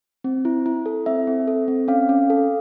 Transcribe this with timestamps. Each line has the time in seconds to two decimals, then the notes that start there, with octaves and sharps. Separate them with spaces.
0.24 C4
0.45 E4
0.66 E4
0.86 A4
1.06 C4 E5
1.27 C4
1.48 A4
1.68 C4
1.88 C#4 F5
2.09 C#4
2.30 A4